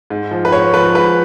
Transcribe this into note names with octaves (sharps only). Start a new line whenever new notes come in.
G#2
F3
B4
G#2 C#5
F3 B4
G#2 B4